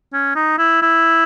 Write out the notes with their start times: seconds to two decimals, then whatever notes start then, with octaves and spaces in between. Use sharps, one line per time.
0.13 C#4
0.36 D#4
0.58 E4
0.82 E4